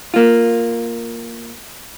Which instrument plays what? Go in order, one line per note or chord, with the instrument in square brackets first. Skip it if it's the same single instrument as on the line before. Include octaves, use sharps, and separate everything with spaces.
[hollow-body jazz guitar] A#3 F4